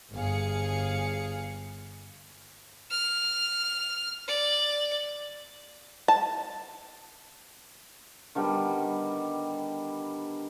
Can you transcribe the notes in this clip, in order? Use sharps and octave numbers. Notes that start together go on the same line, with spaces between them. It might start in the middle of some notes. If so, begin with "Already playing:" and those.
G1 G#4 F5 C#7
F6
D5
A5
D3 D#3 G3 B3